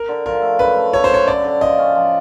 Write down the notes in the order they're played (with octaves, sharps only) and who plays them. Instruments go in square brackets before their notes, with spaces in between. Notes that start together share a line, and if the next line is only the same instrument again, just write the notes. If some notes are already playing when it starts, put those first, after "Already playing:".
Already playing: [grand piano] A#4
[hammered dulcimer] D3
[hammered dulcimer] F3 [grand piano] A#4
[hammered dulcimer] A3
[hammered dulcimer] F#2 [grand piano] B4
[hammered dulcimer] A3
[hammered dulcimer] A3 [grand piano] C#5
[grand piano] C5
[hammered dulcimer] F#2 [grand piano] C#5
[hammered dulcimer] D3 [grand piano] D5
[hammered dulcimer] D3
[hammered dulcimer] F3 [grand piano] D#5
[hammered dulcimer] C#4
F3